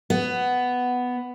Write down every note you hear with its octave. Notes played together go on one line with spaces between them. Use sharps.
B3